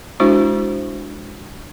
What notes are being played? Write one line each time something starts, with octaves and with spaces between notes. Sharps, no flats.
G#3 D4 E4 F#4 C5